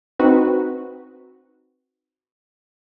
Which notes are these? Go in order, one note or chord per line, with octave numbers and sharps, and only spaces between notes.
C4 D#4 F#4 B4